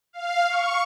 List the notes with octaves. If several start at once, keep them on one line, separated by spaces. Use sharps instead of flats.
F5
C#6